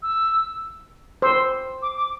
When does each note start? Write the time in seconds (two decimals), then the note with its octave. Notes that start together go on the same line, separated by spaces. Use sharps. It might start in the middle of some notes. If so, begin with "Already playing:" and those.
0.03 E6
1.22 C5 E6
1.82 D6
1.97 D6